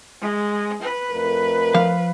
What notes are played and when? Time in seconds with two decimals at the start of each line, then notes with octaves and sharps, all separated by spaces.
0.22 G#3
0.82 B4
1.11 F2 A3 A#4
1.74 F3 F5